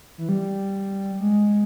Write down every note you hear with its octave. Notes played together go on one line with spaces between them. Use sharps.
E3
G3
G#3